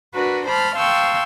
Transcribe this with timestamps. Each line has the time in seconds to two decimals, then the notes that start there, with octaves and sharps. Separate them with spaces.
0.15 D4 F#4 A#4 B4
0.46 C5 A5 B5 F6
0.76 F5 G5 A5 C6 C#6 E6